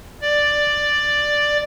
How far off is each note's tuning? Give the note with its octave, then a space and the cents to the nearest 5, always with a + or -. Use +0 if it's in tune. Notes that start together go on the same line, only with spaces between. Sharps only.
D5 +5